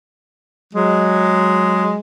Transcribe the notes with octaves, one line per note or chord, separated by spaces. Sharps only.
F#3 G#3